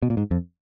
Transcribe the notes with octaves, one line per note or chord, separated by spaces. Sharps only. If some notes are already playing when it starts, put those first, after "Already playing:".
B2
A#2
G#2
F2